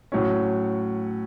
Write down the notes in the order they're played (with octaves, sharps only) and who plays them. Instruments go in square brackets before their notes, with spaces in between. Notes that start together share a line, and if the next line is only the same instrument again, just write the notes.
[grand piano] A2 F#3 C#4